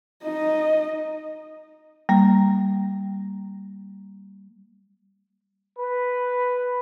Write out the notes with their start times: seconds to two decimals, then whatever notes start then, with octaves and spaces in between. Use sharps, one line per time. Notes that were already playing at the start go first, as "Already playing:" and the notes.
0.24 D#4 D#5
2.09 G3 A#3
5.78 B4